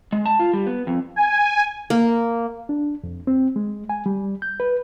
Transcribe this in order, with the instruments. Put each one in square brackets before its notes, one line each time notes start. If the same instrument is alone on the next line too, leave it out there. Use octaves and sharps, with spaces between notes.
[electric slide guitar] G#3
A5
F4
G3
B3
F2
[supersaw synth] G#5
[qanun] A#3
[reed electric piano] D4
F2
C4
G#3
G#5
G3
G6
B4